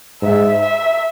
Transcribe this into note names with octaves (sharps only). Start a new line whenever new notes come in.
G#2 E5
E5